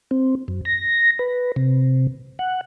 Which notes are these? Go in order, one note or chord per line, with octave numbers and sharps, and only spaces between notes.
C4
F#2
A#6
B4
C3
F#5